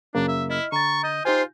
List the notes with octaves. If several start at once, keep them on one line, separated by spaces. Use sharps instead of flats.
F#2 C#3 A#3 D4
E5
E4 D#5 F6
D3 A#5 C#6 A6
D#5 G6
D#4 F4 G4 C5 G#5